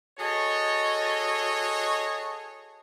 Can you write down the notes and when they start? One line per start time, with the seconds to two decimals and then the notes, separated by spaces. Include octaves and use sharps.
0.19 F#4 G#4 A4 C#5 D#5